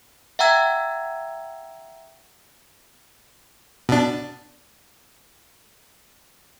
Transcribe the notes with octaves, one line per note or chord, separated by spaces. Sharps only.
E5 F#5 G5 A#5 E6 G#6
B2 D4